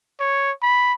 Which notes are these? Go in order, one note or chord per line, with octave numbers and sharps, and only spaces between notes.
C#5
B5